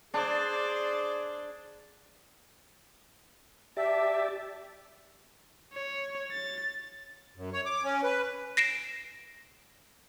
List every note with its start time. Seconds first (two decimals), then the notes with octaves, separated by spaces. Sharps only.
0.14 D4 G#4 C5 D5
3.77 G4 D5 E5 A5
5.73 C#5
6.31 A6
7.36 F#2
7.53 C#5
7.66 D6
7.83 C#4
8.03 B4
8.57 A#6 C7 D7 E7